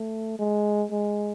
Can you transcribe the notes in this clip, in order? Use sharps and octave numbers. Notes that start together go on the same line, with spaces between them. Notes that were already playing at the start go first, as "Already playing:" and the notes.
Already playing: A3
G#3
G#3